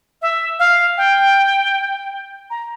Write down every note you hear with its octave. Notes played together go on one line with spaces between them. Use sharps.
E5
F5
G5
A#5